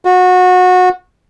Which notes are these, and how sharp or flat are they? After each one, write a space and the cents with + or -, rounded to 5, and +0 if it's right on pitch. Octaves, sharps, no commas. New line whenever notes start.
F#4 -25